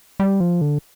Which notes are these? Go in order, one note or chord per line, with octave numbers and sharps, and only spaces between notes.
G3
F3
D3